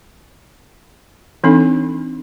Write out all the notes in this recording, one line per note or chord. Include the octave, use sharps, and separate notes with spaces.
E3 C4 D4 D#4 A4